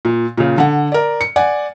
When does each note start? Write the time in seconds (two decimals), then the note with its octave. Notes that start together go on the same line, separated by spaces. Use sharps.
0.05 A#2
0.37 A#2 C#3
0.58 D3 F#5
0.92 A#4 D5
1.21 C#7
1.36 D5 F#5 G#5